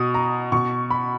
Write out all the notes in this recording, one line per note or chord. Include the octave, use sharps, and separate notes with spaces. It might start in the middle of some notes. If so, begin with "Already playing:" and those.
Already playing: B2 D#6
A#5
B2 C#6
B5